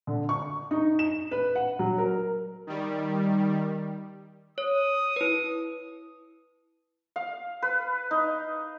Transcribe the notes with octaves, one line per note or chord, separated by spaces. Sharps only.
D3
C#6
D#4
E7
B4
F#5
F#3
A#4
D#3 G3
C#5 D#6
E4 B4
F5
B4
D#4